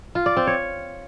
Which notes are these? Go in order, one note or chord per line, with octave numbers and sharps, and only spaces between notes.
F4
D5
C4
C#5